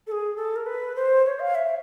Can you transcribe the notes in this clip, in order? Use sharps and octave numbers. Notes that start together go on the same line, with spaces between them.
A4
G#4
A4
A#4
B4
C5
C#5
F5
E5